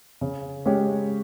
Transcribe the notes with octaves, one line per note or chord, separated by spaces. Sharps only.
C#3
G#3 C#4 G4 C#5